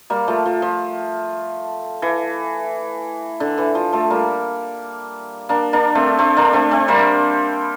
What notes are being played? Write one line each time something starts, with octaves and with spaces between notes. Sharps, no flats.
G3 A#3
F3 A3
F3
F3
E3
D3
E3
F3
F3 A3
G3 A#3
A#3 D4
A#3 D4
A3 C4
A3 C4
A#3 D4
A3 C4
A3 C4
G3 A#3